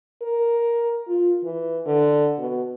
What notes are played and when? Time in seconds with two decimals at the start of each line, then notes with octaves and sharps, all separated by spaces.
0.22 A#4
1.08 F4
1.44 E3
1.86 D3
2.39 B2